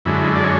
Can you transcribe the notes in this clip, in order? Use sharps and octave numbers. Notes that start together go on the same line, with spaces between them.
F#2 D3 G#3 E4
D5
C#5